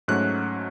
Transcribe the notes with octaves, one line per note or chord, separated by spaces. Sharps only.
G#2 F#3 A3 C#4 F#6